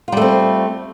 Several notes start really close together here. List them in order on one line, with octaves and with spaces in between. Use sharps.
F4 G3 A3 C4